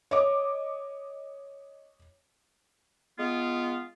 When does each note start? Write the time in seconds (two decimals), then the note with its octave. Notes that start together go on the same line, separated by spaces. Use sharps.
0.11 C#5 D#5 D6
3.18 G#3 B3 F4